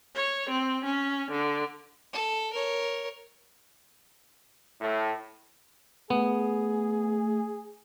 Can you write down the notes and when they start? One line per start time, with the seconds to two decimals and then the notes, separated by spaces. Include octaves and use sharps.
0.16 C#5
0.50 C4
0.85 C#4
1.31 D3
2.13 A4
2.52 A#4 C#5
4.81 A2
6.10 A3 B3 G#4